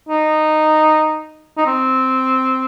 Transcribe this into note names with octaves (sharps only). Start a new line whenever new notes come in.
D#4
D#4
C4